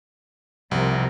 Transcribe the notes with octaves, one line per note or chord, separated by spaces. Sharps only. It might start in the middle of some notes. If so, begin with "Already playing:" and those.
C2 C3 F3 A#4